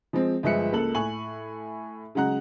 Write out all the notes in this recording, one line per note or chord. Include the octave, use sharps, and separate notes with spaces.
F3 G#3 C4
G1 F3 G#3 E5 F#6 C#7
C#2 A#3 A4 F#7
A2 G#5 C#6 F#7
C#3 F#3 G#3 F#5 A#5 F#6